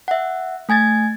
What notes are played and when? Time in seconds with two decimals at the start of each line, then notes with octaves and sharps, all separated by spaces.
0.08 E5 F#5
0.69 A3 G#5 G#6 A6